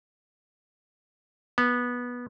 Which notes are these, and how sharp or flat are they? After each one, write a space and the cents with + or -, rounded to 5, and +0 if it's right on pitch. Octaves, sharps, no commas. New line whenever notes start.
B3 -15